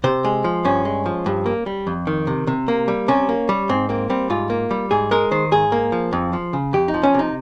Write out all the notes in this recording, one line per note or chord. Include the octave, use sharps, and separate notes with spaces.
C3 C5
G#3
F3
G2 C#4
G#3
F3
G2
A#3
G3
F2
D#3
C3
C3
A#3
G3
C3 C#4
A#3
G3
G#2 C4
A#3 C4
G3 C4
G#2 F4
A#3
G3
G#2 G#4
G#3 A#4
D#3 C5
G#2 G#4
A#3
F3
F2
F3
C#3
F2 G4
D#4
F3
C#4
C3 D#4